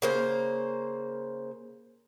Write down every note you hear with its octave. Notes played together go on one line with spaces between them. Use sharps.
C#3 A#3 C5